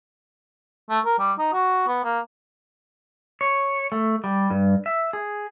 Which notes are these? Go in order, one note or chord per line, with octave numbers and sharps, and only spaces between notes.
A3
A#4
G3
D#4
F#4
B3
A#3
C#5
A3
G3
G2
E5
G#4